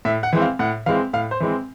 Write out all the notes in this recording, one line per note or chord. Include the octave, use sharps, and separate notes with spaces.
A2 E5
F#5
E3 G#3 C4
F5
A2 F#5
E3 G#3 C4 F5
A2 F5
C5
E3 G#3 C4